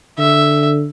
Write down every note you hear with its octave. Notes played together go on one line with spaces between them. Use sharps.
D3 E5